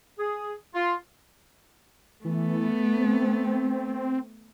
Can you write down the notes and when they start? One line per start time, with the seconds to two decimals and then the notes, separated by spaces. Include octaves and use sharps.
0.19 G#4
0.74 F4
2.25 E3 A3 B3
2.97 C4